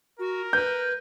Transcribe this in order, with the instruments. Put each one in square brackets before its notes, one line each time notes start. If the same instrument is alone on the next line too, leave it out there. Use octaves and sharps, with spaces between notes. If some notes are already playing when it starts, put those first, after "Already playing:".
[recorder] F#4 [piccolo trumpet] A#4
[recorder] B4 [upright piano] G6